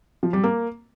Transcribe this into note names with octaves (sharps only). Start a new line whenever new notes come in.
F3
G3
A#3